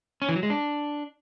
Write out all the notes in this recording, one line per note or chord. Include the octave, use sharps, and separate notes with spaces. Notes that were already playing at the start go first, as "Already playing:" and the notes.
C#4
E3
F#3
G#3
D4